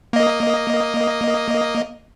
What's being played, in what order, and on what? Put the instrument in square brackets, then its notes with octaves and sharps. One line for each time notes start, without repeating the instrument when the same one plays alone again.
[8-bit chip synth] A#3 D#5